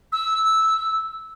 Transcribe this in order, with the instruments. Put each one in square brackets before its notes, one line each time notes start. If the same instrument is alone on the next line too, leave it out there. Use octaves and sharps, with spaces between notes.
[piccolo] E6